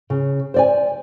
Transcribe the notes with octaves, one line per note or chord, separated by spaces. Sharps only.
C#3
C5 D5 G#5